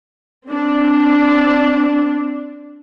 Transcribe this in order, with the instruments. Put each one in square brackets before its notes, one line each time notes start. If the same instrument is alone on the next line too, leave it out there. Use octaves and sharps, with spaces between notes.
[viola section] C4 D4